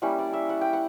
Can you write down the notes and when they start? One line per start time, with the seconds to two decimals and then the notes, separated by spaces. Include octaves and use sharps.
0.02 G3 A#3 C#4 E4 F#5
0.18 D5
0.33 E5
0.49 F#5
0.61 G5
0.73 F#5